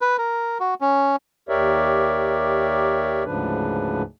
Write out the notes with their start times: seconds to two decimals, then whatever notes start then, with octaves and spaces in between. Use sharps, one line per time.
0.01 B4
0.18 A#4
0.60 F#4
0.81 C#4
1.49 D#2 G4 A#4 C#5 D5 E5
3.25 D2 G#2 C#3 F3 D4 B4